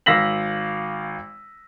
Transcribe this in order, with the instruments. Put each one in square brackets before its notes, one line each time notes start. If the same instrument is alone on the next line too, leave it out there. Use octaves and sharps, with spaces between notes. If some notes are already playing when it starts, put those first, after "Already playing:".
[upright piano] G#1 F5 E6 A#6 B6 F#7